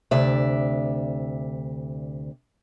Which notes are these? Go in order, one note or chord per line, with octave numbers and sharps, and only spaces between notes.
D2 C3 D5 E5